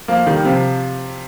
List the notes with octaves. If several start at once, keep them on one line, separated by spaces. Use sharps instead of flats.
F3 A#3
D#3 G3
C3 F3